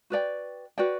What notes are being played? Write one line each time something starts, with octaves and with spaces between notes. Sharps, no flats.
F#4 B4 D5 G5
F#4 B4 D5 G5